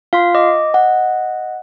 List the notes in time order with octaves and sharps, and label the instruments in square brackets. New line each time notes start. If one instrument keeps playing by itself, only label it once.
[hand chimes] F4 C6 [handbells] F5 B6
[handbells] D#5 [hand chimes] D6
[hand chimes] F#5